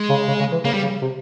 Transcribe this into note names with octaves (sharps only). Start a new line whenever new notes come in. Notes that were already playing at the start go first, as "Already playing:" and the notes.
Already playing: G#3
C#3
C#3
C#3
E3
C#3 A#3
G3
C#3
C3